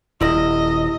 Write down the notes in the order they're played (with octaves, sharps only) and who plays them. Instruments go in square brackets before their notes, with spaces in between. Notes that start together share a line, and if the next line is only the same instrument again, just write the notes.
[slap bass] D#1 [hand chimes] E4 E6 A#6 [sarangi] D#5